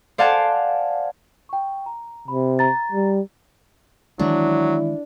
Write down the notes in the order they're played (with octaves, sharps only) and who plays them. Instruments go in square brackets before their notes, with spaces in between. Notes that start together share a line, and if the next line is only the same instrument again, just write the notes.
[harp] C5 D5 F5 F#5 G#5 A5
[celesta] G5 C#6
A#5
[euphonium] C3 [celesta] B5
[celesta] A#5 A6
[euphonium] G3
[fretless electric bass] D#3 E3 G#3 [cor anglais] F#3 [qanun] D4 [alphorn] E4